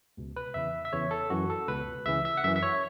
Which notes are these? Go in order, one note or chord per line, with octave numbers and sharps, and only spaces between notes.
C#2 B2
B4
E2 C#3 E3 E5
E5
E2 C#3 E3 C#5
A4
F#2 E3 F#4
A4
C#2 B2 B4
C#2 C#3 E3 E5
E5
F#5
F#2 E3 E5
E5
C#5